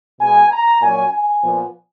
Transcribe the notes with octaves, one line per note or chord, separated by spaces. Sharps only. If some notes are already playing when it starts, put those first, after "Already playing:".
B2 G#3 B3 G#5
A#5
A#2 F#3 C#4 G#5
G#5
A#2 F3 B3